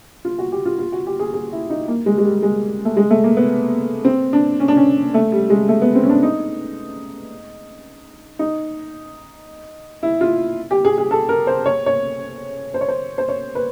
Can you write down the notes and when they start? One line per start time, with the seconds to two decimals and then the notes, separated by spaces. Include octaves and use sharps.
0.25 F4
0.38 F#4
0.52 G4
0.65 F4
0.79 F4
0.92 F#4
1.07 G4
1.19 G#4
1.34 G#4
1.52 E4
1.70 D#4
1.88 A#3
2.06 G#3
2.18 G#3
2.25 G3
2.42 G#3
2.85 A3
2.97 G#3
3.10 A3
3.24 A#3
3.37 B3
4.05 C4
4.33 D4
4.60 C#4
4.68 D4
4.77 C#4
5.14 A3
5.32 G3
5.50 G#3
5.69 A3
5.82 B3
5.95 C4
6.03 C#4
6.09 D4
6.23 D#4
8.39 D#4
10.03 E4
10.21 F4
10.71 G4
10.85 G#4
10.98 G#4
11.11 A4
11.29 A#4
11.47 C5
11.66 C#5
11.86 C#5
12.74 C5
12.81 C#5
12.88 C5
13.18 C5
13.28 C#5
13.55 B4